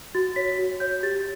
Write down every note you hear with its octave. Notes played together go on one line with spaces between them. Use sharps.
F#4 A6
C#5 B6
F#4
C#5 G6
G4 A6